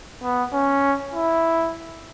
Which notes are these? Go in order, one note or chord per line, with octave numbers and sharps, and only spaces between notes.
B3
C#4
E4